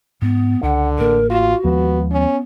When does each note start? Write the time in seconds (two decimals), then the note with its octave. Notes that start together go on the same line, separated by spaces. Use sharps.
0.22 G#2 B3
0.63 C#2 D3 F#5
0.98 A1 A#3 A#4
1.30 F4 F#4
1.64 D#2 F3 G#3 B3
2.12 B3 C#4